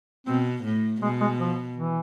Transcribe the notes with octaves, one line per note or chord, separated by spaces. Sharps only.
B2 C4
A2
B2 G#3
G#3
F3
E3